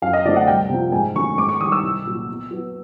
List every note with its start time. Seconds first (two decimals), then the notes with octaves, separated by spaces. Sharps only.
0.02 F#2 F5
0.13 D#5
0.25 D3 F#3 A3 C4 D5
0.36 F#5
0.47 C2 G5
0.69 C3 F3
0.92 G#2 G#5
1.15 D#3 F#3 A3 C#4 C#6
1.38 G#2 D6
1.49 C#6
1.61 D#3 G3 D#6
1.72 E6
1.83 C2
2.06 A#2 F#3
2.28 B2
2.51 F#3 B3